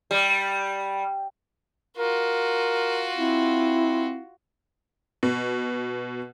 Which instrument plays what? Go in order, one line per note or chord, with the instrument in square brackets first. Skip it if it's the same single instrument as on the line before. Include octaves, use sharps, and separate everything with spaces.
[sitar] G3
[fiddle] F4 F#4 [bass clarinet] A#4
[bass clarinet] C4 [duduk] E4
[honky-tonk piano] B2